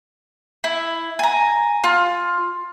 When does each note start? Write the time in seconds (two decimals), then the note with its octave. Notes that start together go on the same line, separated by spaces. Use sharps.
0.64 E4
1.19 G#5 A#5
1.84 F4